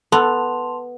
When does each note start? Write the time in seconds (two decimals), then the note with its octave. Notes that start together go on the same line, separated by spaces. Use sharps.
0.12 B3 A4 A5 C6 F7